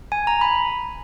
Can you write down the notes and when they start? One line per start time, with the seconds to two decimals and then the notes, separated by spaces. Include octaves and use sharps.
0.12 G#5
0.27 A#5
0.41 B5